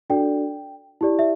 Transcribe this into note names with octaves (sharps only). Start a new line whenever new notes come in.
D4 F#4 A4 D5 G5
E4 G4 D5
E5